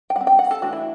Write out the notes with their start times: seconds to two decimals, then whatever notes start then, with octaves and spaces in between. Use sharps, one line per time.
0.10 G5
0.16 G3 C4 F#5
0.27 G5
0.39 F#5
0.51 A4
0.62 E3 A3 D4 F#4
0.73 E4